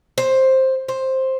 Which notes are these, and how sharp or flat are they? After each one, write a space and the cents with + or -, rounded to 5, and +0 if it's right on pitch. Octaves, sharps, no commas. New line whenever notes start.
C5 +10
C5 +10